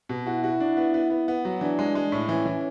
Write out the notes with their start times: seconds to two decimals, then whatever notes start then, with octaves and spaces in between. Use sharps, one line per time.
0.09 B2
0.26 E4 F#4
0.44 F#4
0.60 D4
0.77 B3
0.94 B3
1.10 B3
1.28 B3
1.45 F#3
1.61 E3 D4
1.79 G#3
1.95 G#3
2.12 A2
2.28 E3 C#4
2.45 E3